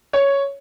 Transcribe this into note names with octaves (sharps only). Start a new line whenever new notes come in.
C#5